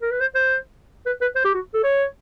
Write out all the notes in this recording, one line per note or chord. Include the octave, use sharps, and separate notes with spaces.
A#4
B4
C5
C5
B4
B4
C5
G4
F#4
A4
C#5